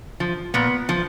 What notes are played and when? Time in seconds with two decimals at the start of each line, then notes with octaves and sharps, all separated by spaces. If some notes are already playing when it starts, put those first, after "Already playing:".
0.20 F3
0.54 A#2 B3
0.89 F3